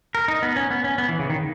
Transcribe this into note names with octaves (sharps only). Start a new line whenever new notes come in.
A#4
D#4
B3
C#4
B3
C#4
B3
E3
C#3
D#3